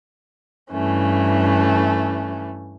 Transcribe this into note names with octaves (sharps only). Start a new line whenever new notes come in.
G2 E3 A3 C#4